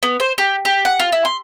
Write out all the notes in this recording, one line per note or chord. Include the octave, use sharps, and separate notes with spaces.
B3
C5
G4
G4
F#5
F4
E4
C6